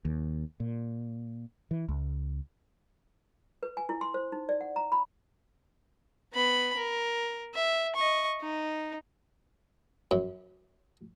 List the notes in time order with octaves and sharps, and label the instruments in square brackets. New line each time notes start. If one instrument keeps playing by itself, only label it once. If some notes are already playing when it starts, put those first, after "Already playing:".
[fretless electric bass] D#2
A#2
E3
C#2
[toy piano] B4
G#5
E4
C6
C5
D#4
D5
F#5
A#5
B5
[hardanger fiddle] B3 B5
A#4
E5
D#5 C#6
D#4
[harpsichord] F#2